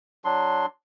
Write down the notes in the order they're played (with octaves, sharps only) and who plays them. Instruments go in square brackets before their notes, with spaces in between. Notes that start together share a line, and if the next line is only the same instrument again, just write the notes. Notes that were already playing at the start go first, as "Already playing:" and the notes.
[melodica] F#3 D4 C6